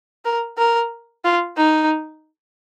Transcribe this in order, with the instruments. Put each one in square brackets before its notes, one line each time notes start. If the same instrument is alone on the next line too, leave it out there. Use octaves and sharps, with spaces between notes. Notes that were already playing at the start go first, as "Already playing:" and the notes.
[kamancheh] A#4
A#4
F4
D#4